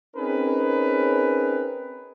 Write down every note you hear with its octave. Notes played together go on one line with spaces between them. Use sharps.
C4 C#4 D#4 G#4 A#4 B4